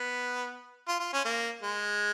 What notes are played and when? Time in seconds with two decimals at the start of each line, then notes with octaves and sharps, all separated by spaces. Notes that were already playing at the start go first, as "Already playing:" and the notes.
Already playing: B3
0.88 F4
1.00 F4
1.13 C#4
1.25 A#3
1.62 G#3